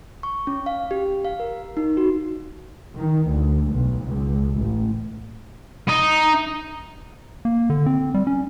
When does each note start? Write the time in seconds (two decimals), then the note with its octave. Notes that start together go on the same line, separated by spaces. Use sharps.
0.23 C#6
0.47 C#4
0.66 F5
0.91 G4
1.25 F5
1.40 A#4
1.77 D#4
1.97 F#4
2.97 D#3
3.29 D2
3.71 B1
4.04 C#2
4.55 A1
5.89 D#4
7.45 A#3
7.70 D3
7.86 C4
8.14 G3
8.27 C#4